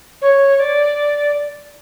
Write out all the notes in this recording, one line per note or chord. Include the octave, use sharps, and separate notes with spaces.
C#5
D5